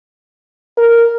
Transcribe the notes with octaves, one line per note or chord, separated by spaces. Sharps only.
A#4